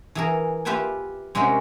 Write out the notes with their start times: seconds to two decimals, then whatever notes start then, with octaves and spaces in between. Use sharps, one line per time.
0.15 E3 G#4 A#4
0.65 F4 G4 B4 E5 G5 G#5
1.35 C3 G#3 C#4 F#4 A#4 C5